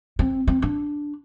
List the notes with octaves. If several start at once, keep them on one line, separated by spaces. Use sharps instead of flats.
C4
C4
D4